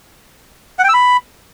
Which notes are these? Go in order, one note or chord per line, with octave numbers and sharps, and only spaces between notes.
F#5
G5
E6
B5